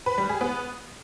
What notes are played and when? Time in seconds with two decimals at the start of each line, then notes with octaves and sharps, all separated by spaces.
0.06 B4
0.18 G3
0.29 G#4
0.41 B3